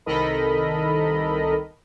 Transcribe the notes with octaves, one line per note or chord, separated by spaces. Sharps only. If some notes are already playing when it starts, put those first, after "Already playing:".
C2 D#3 A4 A#4 D#5 B5